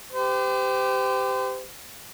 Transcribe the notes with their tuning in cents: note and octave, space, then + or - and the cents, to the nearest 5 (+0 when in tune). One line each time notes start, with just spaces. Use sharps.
G4 +0 C5 -40